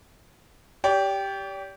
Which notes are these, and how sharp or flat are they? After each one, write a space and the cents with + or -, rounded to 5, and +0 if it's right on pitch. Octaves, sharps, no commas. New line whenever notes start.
G4 +0 D5 -40